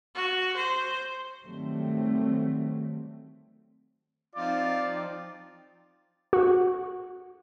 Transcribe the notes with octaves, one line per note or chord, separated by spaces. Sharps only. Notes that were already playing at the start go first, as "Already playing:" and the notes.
F#4
C5
D#3 F#3 G3 A3 C4
F3 C4 D#4 F4 D5
F#4